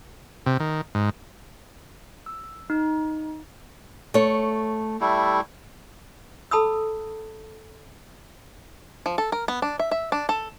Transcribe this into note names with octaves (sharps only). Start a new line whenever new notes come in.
C3
D#3
G#2
E6
D#4
A3 C#5
G3 A3 E4
A4 A5 B5 D#6 E6
F3
A4
A#4
B3
D4
E5
E5
D4
A4